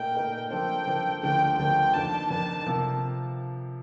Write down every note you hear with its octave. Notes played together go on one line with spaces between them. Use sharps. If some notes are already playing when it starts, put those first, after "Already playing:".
Already playing: A#2 A3 D#4 A#4 G5
A#2 A3 D#4 A#4
F3 A#3 D4 A4 C5 G5
F3 A#3 D4 A4 C5
D2 D3 F3 A#3 G5
D2 D3 F3 A#3 G5
F2 D#3 A#3 D4 A5
F2 D#3 A#3 D4 A5
C3 F3 A#3